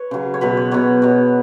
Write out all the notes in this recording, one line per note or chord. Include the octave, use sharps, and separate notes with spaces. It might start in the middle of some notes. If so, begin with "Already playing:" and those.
Already playing: B4 C#5
C#3 F#3
C#5
B2 F#3 B4
C#5
B2 F#3 C#5
B2 F#3